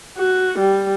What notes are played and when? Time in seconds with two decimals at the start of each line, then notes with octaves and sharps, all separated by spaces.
0.17 F#4
0.59 G3